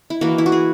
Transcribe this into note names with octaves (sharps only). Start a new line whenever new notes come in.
E4
E3 A#3 F#4
E4
F#4
G#4